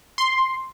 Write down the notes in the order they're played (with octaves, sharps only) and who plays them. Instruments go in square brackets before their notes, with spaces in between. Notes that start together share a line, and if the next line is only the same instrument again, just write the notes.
[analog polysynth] C6